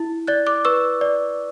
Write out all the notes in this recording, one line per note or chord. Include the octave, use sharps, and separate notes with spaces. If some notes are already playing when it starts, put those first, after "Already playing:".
Already playing: E4
D5 F#6 A6
D6 F#6
B4 C#6 E6
D5